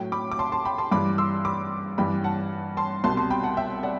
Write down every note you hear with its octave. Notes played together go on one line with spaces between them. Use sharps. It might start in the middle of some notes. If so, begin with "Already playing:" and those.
Already playing: A2 F#3 G5
B5 D6
D6
A5 C6
A5 C6
G5 B5
A5 C6
G2 E3 G3 B5 D6
C6 E6
B5 D6
G2 E3 G3 G5 B5
F#5 A5
A5 C6
C2 B2 G3 A5 C6
A5 C6
G5 B5
F#5 A5
E5 G5
D5 F#5